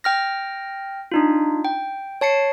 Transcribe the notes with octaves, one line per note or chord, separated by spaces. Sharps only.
G5 F6 A#6
D4 D#4 F4
G5
C#5 A5 C7 C#7